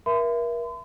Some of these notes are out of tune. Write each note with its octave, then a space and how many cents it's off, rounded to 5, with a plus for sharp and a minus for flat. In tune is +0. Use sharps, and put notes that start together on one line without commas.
A#4 +35 E5 +20 C6 -45